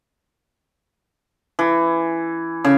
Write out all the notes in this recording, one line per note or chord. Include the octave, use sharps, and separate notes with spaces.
E3
C#3